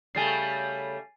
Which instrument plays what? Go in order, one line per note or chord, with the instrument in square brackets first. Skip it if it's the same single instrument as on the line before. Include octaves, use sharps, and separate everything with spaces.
[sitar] C#3 G3 A3 [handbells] G#5 A6 C7